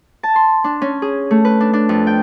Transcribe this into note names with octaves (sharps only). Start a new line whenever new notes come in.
A5
C6
D4
C#4
G#4
A3
B4
D4
D4
F2
G5